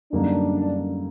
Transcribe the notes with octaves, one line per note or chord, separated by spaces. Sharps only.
F#2 D3 G3 A#3 D4 D#4